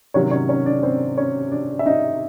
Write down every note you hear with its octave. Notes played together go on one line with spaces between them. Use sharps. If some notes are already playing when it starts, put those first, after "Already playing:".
C3 D#3 F#3 C#4 C#5
C#4 C#5
C#4 C#5
D4 D5
C4 C5
C#4 C#5
D4 D5
E5
D#4 D#5